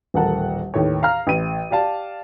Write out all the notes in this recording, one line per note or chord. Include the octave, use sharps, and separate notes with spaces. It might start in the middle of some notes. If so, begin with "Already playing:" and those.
D#1 A1 A4 A#4 F#5 A5
D#2 A2 B4 C#5
F5 A#5 F6
A1 D#7
G4 D5 F5 A5